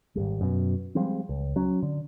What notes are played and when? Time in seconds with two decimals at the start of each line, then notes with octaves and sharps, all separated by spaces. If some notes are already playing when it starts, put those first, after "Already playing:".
0.15 G#1 D#2 G3
0.41 F#2 B2
0.95 F3 G3 G#3 C4
1.29 C#2
1.56 F#3 C#4
1.83 D3